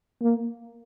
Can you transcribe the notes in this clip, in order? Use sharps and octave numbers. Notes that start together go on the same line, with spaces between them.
A#3